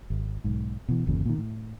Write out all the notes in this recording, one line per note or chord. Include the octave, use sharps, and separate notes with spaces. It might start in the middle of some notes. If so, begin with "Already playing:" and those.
G#1
B1 G#2
B2 E3
G1 E2 A#2 C#3
A#2 D#3
A2